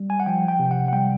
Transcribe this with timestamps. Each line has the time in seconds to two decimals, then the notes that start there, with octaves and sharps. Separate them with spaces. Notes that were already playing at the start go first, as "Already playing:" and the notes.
Already playing: G3
0.10 G#5
0.20 F#5
0.26 F3 G5
0.48 G5
0.59 C3
0.71 F#5
0.88 F#5
0.93 G3 G5